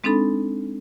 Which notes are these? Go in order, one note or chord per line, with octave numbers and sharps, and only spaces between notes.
G#3 C4 D4 D#4 A4 B5